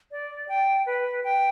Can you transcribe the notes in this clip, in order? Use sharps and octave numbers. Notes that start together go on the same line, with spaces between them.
D5
G5
B4
G5